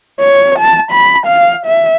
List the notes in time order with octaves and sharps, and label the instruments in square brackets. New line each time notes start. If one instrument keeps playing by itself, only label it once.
[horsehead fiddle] C#5
A5
B5
F5
E5